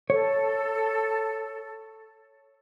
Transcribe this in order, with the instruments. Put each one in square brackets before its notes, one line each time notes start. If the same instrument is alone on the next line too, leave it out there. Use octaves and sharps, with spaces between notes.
[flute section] A4 [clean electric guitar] C#5